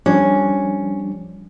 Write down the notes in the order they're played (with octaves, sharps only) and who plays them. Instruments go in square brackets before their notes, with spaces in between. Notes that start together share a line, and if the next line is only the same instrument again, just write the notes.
[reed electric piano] F3 G3 D4 [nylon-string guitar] C#4